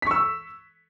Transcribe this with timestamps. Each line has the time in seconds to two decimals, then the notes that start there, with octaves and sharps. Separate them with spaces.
0.02 B6
0.07 C#6
0.11 E6